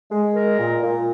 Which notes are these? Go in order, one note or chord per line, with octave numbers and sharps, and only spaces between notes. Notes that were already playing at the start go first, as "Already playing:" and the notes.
G#3
A#4
A#2
A#2